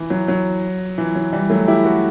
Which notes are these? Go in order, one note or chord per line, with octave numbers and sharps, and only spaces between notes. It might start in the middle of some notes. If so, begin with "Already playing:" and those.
Already playing: E3
F#3
F#3
E3
F#3
E3 G3
F#3 A3
E4 G4
F#4 A4